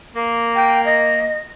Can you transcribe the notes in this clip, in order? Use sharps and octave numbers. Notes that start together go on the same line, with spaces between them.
A#3
G5
D#5